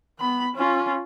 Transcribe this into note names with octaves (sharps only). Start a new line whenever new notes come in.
B3 B5
C#4 F4